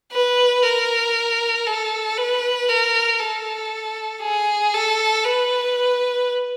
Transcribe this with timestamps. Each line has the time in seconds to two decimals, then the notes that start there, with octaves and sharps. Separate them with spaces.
0.13 B4
0.63 A#4
1.67 A4
2.17 B4
2.69 A#4
3.20 A4
4.22 G#4
4.74 A4
5.25 B4